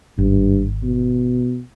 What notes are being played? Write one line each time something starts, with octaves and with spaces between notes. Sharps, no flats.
G#1 G2
B2